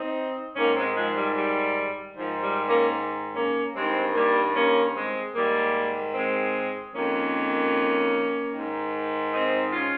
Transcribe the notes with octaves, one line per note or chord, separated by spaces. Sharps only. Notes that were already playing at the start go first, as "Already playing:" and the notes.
Already playing: C4 D#4
G#2 D#3 A#3 C#4
G#3 C4
F3 G#3
G3
G3
G#2 D#3 F3
G3
A#3 C#4
A#3 C#4
G2 D#3 G#3 C4
G3 A#3
A#3 C#4
G#3 C4
G#2 D#3 G3 A#3
G#3 C4
F2 D#3 A#3 C#4
G#2 D#3
C4 D#4
C#4 F4